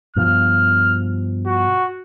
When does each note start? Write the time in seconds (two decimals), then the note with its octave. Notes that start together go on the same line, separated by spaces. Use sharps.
0.16 G2 B2 F3 F6
1.47 F#4